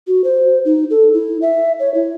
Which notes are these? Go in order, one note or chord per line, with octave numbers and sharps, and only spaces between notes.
F#4
C5
D#4
A4
E4
E5
C#5
E4